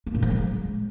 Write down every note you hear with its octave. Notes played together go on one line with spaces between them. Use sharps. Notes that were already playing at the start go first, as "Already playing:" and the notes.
G#3
A#2
F3
G#3